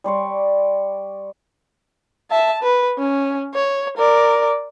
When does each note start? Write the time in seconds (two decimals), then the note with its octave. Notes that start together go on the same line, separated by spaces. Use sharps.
0.04 G3 D5 C6 C#6
2.31 E5 A5
2.62 B4
2.98 C#4
3.54 C#5
3.97 A#4 D5